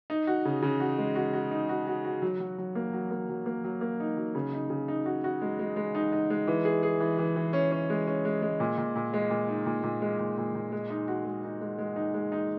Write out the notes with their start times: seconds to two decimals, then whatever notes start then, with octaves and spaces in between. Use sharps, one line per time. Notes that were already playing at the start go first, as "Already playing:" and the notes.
0.10 D#4
0.27 F#4
0.45 C#3
0.62 C#3
0.80 F#4
0.98 G#3
1.15 F#4
1.33 F#4
1.51 D#4
1.69 F#4
1.87 F#4
2.05 F#4
2.22 F#3
2.40 F#3
2.58 F#3
2.75 A#3
2.93 F#3
3.11 A#3
3.29 F#3
3.46 A#3
3.64 F#3
3.81 A#3
4.00 D#4
4.17 F#3
4.35 C#3
4.53 D#4
4.70 C#3
4.88 D#4
5.06 F#4
5.24 F#4
5.42 G#3
5.59 G#3
5.76 G#3
5.95 D#4
6.12 D#4
6.30 G#3
6.47 E3
6.65 G#4
6.83 G#4
7.00 E3
7.19 E3
7.36 E3
7.53 C#4
7.72 C#4
7.90 G#3
8.07 C#4
8.25 G#3
8.42 G#3
8.60 A#2
8.78 A#2
8.96 A#2
9.14 G#3
9.30 A#2
9.48 D#4
9.66 A#2
9.83 A#2
10.02 G#3
10.20 A#2
10.38 A#2
10.55 A#2
10.72 G#3
10.90 D#4
11.08 F#4
11.25 G#3
11.44 D#4
11.61 G#3
11.78 G#3
11.96 D#4
12.14 G#3
12.32 D#4